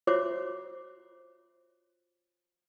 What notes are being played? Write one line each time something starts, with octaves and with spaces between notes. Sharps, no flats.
F4 F#4 C5 C#5 E5 D6